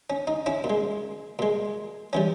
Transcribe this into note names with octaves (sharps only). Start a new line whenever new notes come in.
C#4
D#4
C#4 E4
A#2
G#3
A#2 G#3
E3 G3 C#4